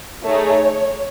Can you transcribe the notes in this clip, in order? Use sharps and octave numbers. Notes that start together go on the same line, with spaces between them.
A3 D#4 G#4 C#5